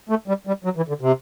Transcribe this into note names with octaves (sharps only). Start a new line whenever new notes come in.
A3
G3
G3
F#3
E3
D3
C3